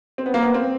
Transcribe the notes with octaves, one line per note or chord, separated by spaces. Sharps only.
C4
B3
A#3
B3
C4